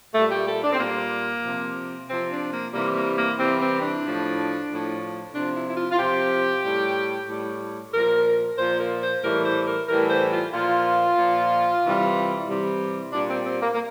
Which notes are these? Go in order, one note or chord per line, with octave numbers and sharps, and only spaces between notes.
A#2 G3 A3
G4
A4
D4
C4
A#2 G3 A#3
C3 F3
C3 F3 C4
D4
A#3
C3 E3 G3 A#3
A#3
A#3
C3 E3 G3 C4
C4
D4
A2 F3
A2 F3
C3 F3 D4
E4
E4
F4
F4
C3 F3 G4
A2 G3
A2 G3
A#2 F3 A#4
A#2 F3 C5
A#4
C5
A2 E3 G3 A#4
C5
A#4
A2 E3 G3 A#4
C5
F4
A#2 F3 F4
A#2 F3
C3 E3 G3
C3 E3 G3
A#2 G3 D4
C4
C4
A#3
A#3